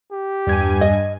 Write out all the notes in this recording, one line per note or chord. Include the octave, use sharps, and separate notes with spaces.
G4
E2 G2 G#5 G#6
D#5